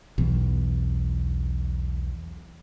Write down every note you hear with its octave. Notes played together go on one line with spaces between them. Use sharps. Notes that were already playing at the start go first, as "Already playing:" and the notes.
B1 E2